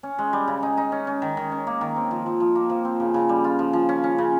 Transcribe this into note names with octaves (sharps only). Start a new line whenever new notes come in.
C#4
G#3
G3
C#3
D#4
D#4
C#4
C#4
D#3
D#3
C#4
A#3
D#3
C4
F3
F3
F3
A#3
F3
C4
C#3
C#3
G3
F4
F3
F3
C#4
C#4
C#3